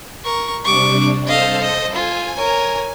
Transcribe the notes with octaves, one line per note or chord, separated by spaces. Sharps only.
A#4 C#6
C3 G3 D4 C#6 D6
A4 C5 D#5 F5
D#5
F4 G#5
A#4 C#5